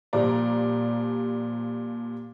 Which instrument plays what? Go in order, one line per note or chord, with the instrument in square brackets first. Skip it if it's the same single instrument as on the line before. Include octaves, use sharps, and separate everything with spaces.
[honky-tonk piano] A#2 F3 G3 D5 A#5